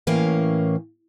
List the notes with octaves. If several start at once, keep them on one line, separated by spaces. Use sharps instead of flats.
A2 E3 A#3 C#4 F5